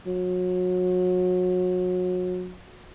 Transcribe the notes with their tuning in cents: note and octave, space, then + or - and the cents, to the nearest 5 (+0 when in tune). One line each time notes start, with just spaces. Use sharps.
F#3 -30